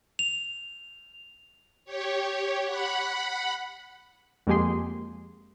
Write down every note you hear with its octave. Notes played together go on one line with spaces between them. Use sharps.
F7
G4 C#5
F#5 B5
F2 G#3 A#3 G4 G#4 C6